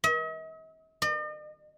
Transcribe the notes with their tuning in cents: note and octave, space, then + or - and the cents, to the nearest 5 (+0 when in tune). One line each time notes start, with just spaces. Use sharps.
D#5 +45
D#5 -45